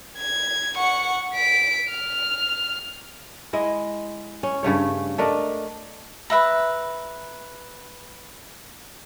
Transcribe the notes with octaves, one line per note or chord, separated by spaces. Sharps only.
G#6
F#5 C#6
B6 D7
F6
G#3 E4 D#5
C#4
G2 C#3 A3 C#5
A3 D4 A#4 D#5
B4 E5 A#5